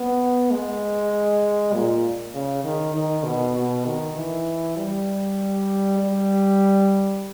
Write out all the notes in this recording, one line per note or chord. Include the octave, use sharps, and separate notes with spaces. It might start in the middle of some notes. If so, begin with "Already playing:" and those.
Already playing: B3
G#3
A#2
C#3
D#3
D#3
B2
B2
D#3
E3
G3
G3